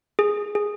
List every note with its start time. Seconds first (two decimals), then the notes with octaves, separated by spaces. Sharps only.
0.19 G#4
0.55 G#4